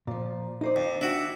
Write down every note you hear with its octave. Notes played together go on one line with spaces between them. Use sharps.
A#2 F3
D#4 C5 D5
F2
D4 E4 F#4 G5